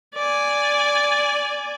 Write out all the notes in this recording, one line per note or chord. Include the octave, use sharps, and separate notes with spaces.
D5 G#5